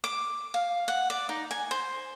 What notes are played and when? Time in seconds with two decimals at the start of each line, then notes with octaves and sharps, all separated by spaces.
0.04 D6
0.54 F5
0.88 F#5
1.10 D5
1.29 D#4
1.51 G#5
1.71 C5